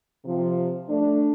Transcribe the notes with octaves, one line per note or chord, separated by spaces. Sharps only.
C3 F3
A3 D4